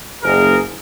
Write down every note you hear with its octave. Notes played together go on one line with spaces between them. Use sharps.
F#1 G#4 A#4